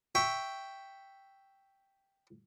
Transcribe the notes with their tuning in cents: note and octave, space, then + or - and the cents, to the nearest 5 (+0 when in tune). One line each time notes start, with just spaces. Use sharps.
E5 +0 G5 +0 C#6 +5